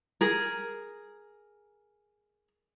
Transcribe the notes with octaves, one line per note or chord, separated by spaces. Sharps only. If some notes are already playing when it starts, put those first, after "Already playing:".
G#4 A#4